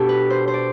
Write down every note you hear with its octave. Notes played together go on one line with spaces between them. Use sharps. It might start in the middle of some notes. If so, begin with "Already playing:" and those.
Already playing: B2 B3 D4 G4 A4
B4
C5
C5
D5